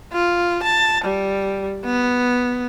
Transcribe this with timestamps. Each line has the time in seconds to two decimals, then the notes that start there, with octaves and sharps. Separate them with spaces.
0.13 F4
0.63 A5
1.04 G3
1.85 B3